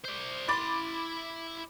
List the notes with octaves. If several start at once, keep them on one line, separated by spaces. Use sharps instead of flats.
C5 D5
E4 B5 C6 D6 A6